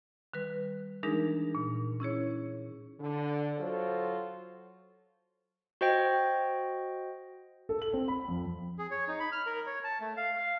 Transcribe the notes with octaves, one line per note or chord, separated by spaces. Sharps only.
D#3 G3 B4
E3 G#3 D4 D#4 G#4 A#4
A#2
C#4 E4 G#4 C#5
D3
F#3 F4 F#4 A4 C5
F#4 C5 D#5 G5
A4
F#7
C4
B5
F2
G#4
C#5
D#4
B5
F6
A#4
C#5
A5
A3
F5
F5